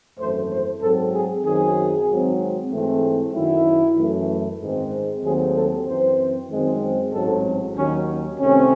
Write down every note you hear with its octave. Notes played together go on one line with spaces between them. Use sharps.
G#1 F#2 E3 A3 C5
C5
G#2 F#3 C4 A4
G#4
F#2 D#3 F#3 C4 G#4
G#1 G#2 F#3 C4
G#2 E3 A3 C4
F#2 D#3 F#3 E4
F#2 E3 A3
G#2 D#3 G#3 C4
D#2 D#3 F#3 A3 C4 G#4
A4
F#2 E3 C4 C5
F#2 D#3 G#3 C4
A1 G#2 F#3 C4 A4
D#2 D#3 F#3 C#4
C2 C3 D#3 A3 C4 C#4